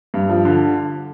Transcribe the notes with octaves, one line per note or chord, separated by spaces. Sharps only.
G2
F3
D3